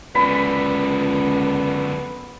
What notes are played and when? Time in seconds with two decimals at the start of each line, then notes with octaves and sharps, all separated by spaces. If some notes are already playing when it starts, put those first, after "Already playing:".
0.15 C#2 F#2 D3 B3 B5